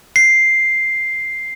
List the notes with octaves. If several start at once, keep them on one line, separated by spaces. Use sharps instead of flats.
C7